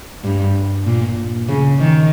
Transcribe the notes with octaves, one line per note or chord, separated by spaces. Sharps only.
G2
A#2
C#3
D#3